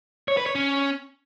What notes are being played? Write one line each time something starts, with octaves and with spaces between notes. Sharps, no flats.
C#5
B4
C#5
C#4